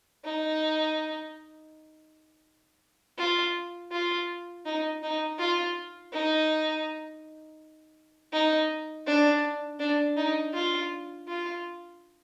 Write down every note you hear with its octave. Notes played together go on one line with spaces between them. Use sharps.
D#4
F4
F4
D#4
D#4
F4
D#4
D#4
D4
D4
D#4
F4
F4